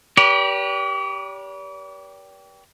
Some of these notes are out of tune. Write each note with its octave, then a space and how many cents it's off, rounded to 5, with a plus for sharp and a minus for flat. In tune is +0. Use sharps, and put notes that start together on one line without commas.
G4 +0 B4 -40 D5 -45